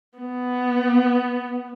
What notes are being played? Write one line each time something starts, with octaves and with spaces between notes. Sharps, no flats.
B3